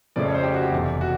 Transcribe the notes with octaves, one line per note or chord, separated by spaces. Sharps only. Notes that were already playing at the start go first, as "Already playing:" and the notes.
F2 C#3 F3 A3 D5
C#5
C5
G4
F#4
G4
F1 E2 C3
F#4